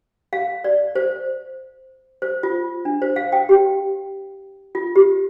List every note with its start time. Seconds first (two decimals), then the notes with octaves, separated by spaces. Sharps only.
0.33 F5
0.64 D5
0.95 C5
2.22 C5
2.43 F4
2.85 D4
3.02 C5
3.16 F5
3.32 G5
3.49 G4
4.75 F4
4.96 G4